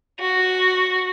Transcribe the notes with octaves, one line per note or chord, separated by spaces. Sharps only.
F#4